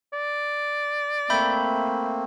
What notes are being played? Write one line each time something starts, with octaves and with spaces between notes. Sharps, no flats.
D5
A3 A#3 C4 E5 B5 G6